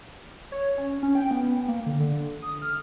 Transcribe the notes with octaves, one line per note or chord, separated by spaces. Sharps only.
C#5
C#4
C#4
G5
B3
A#3
D3
D3
D#6
F6